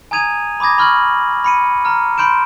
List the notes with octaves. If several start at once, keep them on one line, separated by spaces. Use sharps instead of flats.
G#5 A#5 D#6 G#6 D#7 F7
B5 D6 D#6 G#6 A#6
B5 C#6 F6 F#6 G#6 F#7
B5 C#7 D#7
A#5 F6
B5 C6 G6 D7 E7